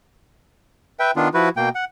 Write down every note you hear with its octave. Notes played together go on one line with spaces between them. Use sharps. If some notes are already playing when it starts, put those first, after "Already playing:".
B4 E5 G5
D#3 B3 D4 F4
F3 E4 F#4 B4
B2 A#3 G5
F#5